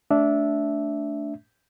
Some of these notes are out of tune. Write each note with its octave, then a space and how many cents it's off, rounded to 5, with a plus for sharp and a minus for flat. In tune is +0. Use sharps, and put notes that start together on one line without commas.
A3 +0 D4 -15 E5 -5